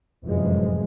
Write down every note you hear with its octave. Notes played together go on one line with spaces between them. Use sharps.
F1 F#2 A2 E3 F3 G#3